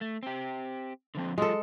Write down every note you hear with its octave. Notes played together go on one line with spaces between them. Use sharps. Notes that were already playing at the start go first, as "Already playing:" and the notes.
A3
C4 G4
D3 F3 C4
F#3 G#3 F4 A4